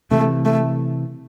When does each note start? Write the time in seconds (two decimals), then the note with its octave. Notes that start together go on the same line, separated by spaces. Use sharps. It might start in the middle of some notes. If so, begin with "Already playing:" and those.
0.11 C3 E3 A3
0.45 A3